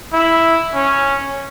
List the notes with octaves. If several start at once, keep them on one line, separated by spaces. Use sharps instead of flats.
E4
C#4